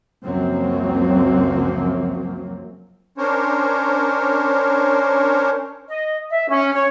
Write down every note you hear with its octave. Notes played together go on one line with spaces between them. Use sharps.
C#2 F#2 F3 F#3 A#3 C4
C#4 D4 A#4 C5 C#5
D#5
E5
C#4
C#5